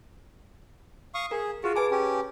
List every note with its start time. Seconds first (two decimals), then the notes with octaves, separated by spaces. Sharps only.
1.15 F5 C#6 D#6
1.31 G#4 A#4
1.64 F4 F#4 G#4
1.76 B4 G#5 A5 D6
1.91 C#4 G4